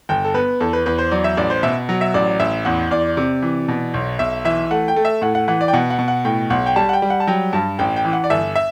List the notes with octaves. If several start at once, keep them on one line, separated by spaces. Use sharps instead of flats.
G1 G5
A4
B3 B4
E2 A4
B4
E2 B4
C5
F#3 D5
E5
A1 D5
C5
B2 E5
F#3
E5
A1 D5
A1 E5
E2 F#5
E2 D5
C3
E3
B2
B1
B1 E5
E3 E5
A3 F#5
G5
A3
E5
A2 F#5
F#5
E3 F#5
D5
G5
B2 F#5
F#5
B2
F#5
A2 G5
B1 F#5
G5
G3 A5
F#5
G5
G3
F#5
A5
F#3 G5
G2 A5
A1 G5
G5
E3
F#5
D5
G1 E5
E5